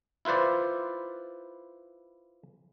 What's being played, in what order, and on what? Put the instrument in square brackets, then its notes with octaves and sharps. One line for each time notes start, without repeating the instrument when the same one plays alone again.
[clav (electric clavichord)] E4 F4 B4 C5 D5